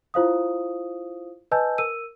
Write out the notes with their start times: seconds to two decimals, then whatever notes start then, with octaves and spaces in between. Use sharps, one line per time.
0.14 E4 F4 C5 F5 D#6
1.51 B4 D#5 G#5 A5 E6 G6
1.78 A#4 E6 D#7